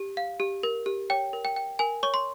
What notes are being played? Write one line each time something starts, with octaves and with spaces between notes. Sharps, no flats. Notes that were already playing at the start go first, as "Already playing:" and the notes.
Already playing: G4
F5
G4
A#4
G4
C#5 G5
A#4
G5
G5
A#4 G#5
C#5 C#6
C6